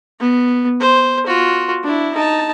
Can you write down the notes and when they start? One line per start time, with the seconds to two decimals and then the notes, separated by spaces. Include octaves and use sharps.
0.20 B3
0.80 C5
1.26 F4 F#4
1.83 D4 E4
2.14 D#4 A5